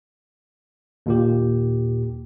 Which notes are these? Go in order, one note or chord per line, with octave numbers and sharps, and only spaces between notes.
D#2 A#2 G4